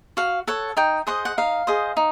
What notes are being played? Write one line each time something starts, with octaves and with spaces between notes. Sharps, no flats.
F#4 F5
A4 C#5 F#5
D#4 G5
G#4 C5 D#5 F#5
F#5
D#4 F5
G#4 C5 D#5
D#4